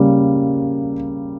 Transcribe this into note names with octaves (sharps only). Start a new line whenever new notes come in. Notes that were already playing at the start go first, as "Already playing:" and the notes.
Already playing: C#3 G3 A#3